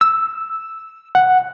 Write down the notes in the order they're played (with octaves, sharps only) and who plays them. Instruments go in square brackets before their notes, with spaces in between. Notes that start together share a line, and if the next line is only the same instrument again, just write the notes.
[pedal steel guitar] E6
[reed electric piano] F#5